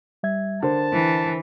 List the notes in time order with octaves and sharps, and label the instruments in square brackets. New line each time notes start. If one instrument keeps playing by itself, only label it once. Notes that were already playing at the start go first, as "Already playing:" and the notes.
[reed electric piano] G3 E5 G#6
[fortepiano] D3 [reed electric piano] A#4 C5 [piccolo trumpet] A5
[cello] E3